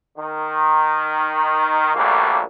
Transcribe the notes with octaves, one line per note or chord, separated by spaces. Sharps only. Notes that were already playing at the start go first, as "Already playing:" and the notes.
D#3
A#1 F#2 G3 A3 A#3